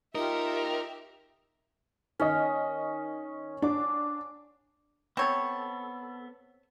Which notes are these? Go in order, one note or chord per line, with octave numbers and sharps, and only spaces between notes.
D#4 F4 G4 A#4 E5
D#3 C#4 D#5
D4 D6
B3 C4 A4 C#5